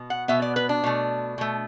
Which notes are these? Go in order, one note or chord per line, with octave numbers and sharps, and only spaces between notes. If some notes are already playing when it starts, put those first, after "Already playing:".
Already playing: B2
F#5
B2 B3 E5
D5
B4
D4
B2 A3
B2 A3